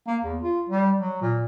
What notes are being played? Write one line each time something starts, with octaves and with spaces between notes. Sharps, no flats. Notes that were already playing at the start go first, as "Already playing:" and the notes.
A#3
E2
F4
G3
F#3
A#2